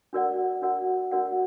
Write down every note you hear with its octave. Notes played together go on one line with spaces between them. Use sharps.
D4 F#4 A#4 D5 F#5
D4 F#4 A#4 D5 F#5
D4 F#4 A#4 D5 F#5